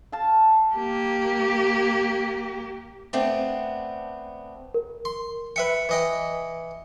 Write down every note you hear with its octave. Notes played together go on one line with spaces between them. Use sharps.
F5 A5
A#3 G4
A3 B3 C4 D4
A#4
C6
B4 E5 G5 C#7
E3 D#5 G5